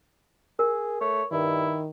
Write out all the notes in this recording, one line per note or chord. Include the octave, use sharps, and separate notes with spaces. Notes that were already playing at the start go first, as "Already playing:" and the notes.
G#4 A#4
A3 C#5
G2 D#3 E4